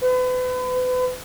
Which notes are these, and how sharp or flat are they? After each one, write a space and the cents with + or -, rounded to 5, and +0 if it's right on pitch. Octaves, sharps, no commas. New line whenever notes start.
B4 +35